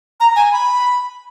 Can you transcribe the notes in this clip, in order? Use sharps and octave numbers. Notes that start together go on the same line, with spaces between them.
A#5
G#5
B5